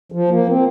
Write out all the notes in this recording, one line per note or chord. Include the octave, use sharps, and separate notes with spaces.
F3
A#3
C4